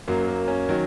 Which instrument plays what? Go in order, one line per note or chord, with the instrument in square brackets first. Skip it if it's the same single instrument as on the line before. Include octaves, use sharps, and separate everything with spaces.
[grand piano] F#2 F#3 A#3
A#3
C#4
D#3 F#3